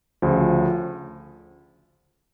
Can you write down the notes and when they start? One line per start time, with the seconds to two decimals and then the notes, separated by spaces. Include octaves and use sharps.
0.22 D2 C#3 F3